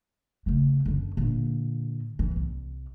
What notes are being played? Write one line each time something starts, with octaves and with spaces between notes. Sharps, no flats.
C#3 A3
F#2 D3
A#2 D3
E3
C2